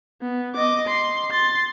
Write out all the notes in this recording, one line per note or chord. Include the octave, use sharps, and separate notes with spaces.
B3
D#5 D6
C6
C6 A6